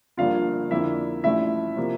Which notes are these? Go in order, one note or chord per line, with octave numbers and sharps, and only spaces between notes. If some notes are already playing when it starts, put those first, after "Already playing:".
G1 G2 D3 F3 A#3 F4 F5
F2 D3 F3 A#3 E4 E5
A1 G2 F3 A3 E4 E5
C3 F3 A#3